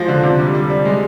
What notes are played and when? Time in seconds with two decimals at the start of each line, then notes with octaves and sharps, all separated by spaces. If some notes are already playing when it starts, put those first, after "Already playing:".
Already playing: F3 G#3 A#6
0.08 D3
0.23 C3
0.39 G3
0.54 G3
0.70 G3
0.85 G#3